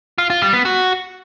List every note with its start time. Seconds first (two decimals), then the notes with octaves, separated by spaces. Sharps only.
0.18 F4
0.30 F4
0.42 G3
0.53 B3
0.65 F#4